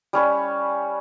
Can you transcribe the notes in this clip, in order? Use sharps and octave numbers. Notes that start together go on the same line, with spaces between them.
G3 C#4 B4